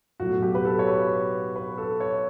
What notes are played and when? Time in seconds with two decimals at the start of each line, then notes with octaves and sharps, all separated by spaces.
0.20 B1 A2 F#3 F#4
0.42 G4
0.55 B4
0.65 A4
0.79 C#5
0.88 B4
1.56 B4
1.78 A4
2.00 C#5